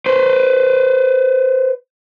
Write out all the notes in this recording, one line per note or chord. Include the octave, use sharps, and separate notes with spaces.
B4 C5